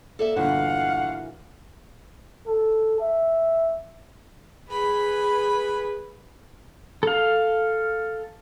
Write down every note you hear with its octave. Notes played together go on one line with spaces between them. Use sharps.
A#3 A4 D5 E5
G1 A#2 E3 F#4 F5 F#5
A4
E5
G#4 B4 B5
A4 F5